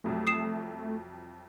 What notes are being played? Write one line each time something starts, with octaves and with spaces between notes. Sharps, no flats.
C2 F2 F#3 A3
D#6 C7 E7